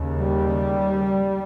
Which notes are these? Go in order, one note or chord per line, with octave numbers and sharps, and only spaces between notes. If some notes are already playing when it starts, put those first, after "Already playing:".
Already playing: D#2 C#3
G3